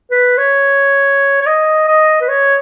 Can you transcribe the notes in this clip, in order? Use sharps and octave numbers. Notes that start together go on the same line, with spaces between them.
B4
C#5
C#5
D#5
D#5
B4
C#5